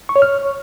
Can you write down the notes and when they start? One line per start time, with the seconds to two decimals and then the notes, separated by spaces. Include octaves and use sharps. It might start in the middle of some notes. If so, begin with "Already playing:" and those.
0.09 C#6
0.16 C#5
0.22 F6